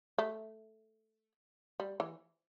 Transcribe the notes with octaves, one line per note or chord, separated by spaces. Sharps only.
A3
G3
E3